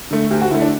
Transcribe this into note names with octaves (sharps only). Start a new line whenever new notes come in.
D3 A3
D2 G4
F#4
D3 A3 E4
D4